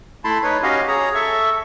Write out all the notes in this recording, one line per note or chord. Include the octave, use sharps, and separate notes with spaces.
A3 E4 A5 B5 C6
D#4 B4 C#5
C#4 F#4 G4 D#5 F5
G#4 C#5 A#5
A4 E5 C#6